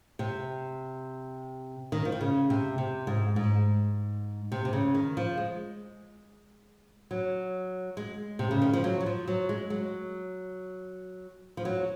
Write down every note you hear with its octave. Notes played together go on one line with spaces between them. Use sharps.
C3
D#3
F3
D#3
C#3
C3
C3
G#2
G#2
C3
C3
C#3
D#3
F3
G#3
F#3
G#3
C3
C#3
D#3
F3
F#3
F#3
F3
F#3
G#3
F#3
F3
F#3